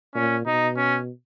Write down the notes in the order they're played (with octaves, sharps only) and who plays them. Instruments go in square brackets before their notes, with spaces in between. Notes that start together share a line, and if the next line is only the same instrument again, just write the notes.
[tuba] A#2 [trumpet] C#4
[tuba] B2 [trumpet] D#4
[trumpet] C#4